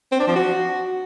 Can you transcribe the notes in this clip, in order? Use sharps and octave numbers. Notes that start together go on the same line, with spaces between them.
C4
D4
F3
F#4